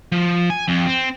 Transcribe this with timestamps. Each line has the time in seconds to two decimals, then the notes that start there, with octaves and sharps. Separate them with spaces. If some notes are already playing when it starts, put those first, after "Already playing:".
0.12 F3
0.50 G#5
0.68 F2
0.87 C4